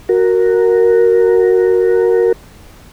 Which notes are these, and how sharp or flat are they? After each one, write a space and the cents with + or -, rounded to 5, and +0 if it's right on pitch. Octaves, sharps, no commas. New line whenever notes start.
F#4 +0 A#4 -5